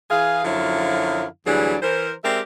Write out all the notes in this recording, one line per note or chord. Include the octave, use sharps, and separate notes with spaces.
E3 G#4 F5
F#2 D3 F3 F#3 E4 F5
D2 E3 F#3 G3 D4 G#4
E3 A#4 C5
G#3 C4 G4 A#4 D5 E5